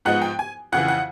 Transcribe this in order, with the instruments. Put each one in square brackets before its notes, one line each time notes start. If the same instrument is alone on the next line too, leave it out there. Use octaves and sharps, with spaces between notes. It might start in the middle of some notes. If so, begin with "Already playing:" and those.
[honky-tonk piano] G#2 F3 G#3 B3 D#4 F#5
G5
G#5
F2 C#3 E3 F#5
F#5